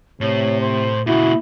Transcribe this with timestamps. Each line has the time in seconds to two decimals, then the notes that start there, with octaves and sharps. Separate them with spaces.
0.21 A2 C3 C#5
0.60 C5
1.07 A#2 C#3 E4 F#4